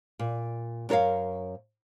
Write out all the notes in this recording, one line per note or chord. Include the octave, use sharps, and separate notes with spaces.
A#2
F#2 D4 A#4 C#5 F5